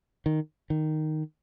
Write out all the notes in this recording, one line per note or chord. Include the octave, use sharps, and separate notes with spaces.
D#3
D#3